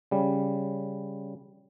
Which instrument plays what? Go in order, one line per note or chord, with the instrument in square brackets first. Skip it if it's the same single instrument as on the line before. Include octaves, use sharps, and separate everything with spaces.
[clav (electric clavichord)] C#3 G3